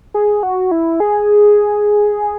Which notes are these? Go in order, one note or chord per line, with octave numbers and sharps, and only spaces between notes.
G#4
F#4
E4
G#4